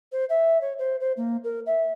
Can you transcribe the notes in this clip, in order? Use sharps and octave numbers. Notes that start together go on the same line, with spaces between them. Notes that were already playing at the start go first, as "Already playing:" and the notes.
C5
E5
C#5
C5
C5
A#3
A#4
E5